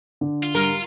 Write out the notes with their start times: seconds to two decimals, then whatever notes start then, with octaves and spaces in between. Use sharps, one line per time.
0.21 D3
0.43 F4
0.55 G#2 G3 A#4